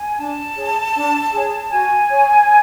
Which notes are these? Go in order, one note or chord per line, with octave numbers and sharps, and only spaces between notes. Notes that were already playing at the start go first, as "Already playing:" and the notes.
Already playing: G#5
D4 A5
G#4 C#5
D4
G#4 C#5
F#4 G#5
C#5